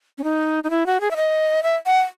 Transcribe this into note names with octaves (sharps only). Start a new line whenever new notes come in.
C#4
D#4
D#4
E4
F#4
G#4
E5
D#5
E5
F#5